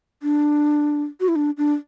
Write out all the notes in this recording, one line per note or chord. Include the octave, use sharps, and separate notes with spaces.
D4
F#4
E4
D4
D4